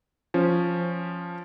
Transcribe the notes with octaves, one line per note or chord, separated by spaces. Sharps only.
F3 C#4